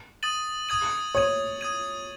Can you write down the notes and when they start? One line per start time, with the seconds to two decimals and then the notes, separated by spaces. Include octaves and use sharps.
0.23 D#6 A6 D#7 F#7
0.69 D#6 G#6 D#7
1.15 C#5 D#6 G#6 D#7
1.61 D#6 G#6 D#7